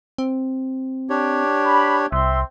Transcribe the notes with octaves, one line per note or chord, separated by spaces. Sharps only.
C4
D4 G4 C#5
B5
C2 C4 E5 C6